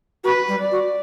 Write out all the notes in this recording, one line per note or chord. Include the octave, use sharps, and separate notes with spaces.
F#4 B4
G3
D5
F#4